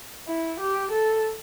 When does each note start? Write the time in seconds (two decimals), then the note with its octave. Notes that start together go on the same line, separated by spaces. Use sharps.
0.28 E4
0.60 G4
0.91 A4